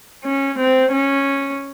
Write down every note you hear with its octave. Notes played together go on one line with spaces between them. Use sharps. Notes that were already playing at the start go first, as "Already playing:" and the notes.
C#4
C4
C#4